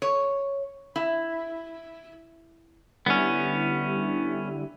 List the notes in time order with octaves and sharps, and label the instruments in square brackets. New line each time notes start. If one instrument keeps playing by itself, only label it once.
[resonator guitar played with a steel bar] C#5
E4
[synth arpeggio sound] D3 G3 E4 [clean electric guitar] B3 C#4